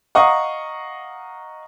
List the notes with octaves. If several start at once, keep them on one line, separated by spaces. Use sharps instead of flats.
D#5 F5 F#5 A#5 C#6 D#6